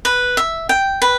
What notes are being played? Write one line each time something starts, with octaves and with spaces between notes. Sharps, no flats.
B4
E5
G5
B4